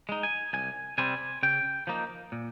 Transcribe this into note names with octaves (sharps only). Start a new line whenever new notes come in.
G#3 D#4
G#5
C2 G#5
C3 G3 C4 G#5
C#3 G5
F3 A#3 D#4
A#2